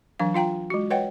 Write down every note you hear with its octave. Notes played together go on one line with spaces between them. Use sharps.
E3 F#3 D4 F5
F4 F5 G5 A#5
G#3 F#4
B4 C#5 D#5 F#5 G5